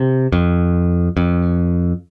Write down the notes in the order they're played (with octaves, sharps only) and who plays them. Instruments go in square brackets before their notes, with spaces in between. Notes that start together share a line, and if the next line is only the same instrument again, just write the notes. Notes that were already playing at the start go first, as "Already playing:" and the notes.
Already playing: [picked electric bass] C3
F2
F2